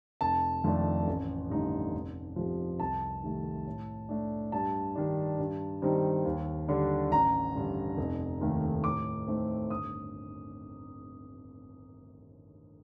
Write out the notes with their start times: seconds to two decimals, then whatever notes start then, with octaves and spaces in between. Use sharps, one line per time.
0.21 F1 A5
0.64 F2 D#3 A3 D4
1.07 A1
1.50 G2 D3 A3 D#4
1.94 F1
2.36 F2 C3 F3
2.80 C2 A5
3.22 C3 D#3 A3
3.66 A2
4.09 A3 D4
4.52 G2 A5
4.95 D#3 G3 D4
5.39 G2
5.82 D#3 G3 C4 D#4
6.25 D#2
6.68 D3 G3 D4
7.11 A1 A#5
7.55 G2 D3
7.97 F1
8.41 D#2 D#3 A3
8.84 A2 D6
9.27 A3 C4 D#4
9.70 G1 D#6